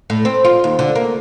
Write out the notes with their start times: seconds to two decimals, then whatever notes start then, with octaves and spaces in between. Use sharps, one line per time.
0.10 A2
0.25 C4
0.45 F4
0.64 D#2
0.79 D3
0.96 A#3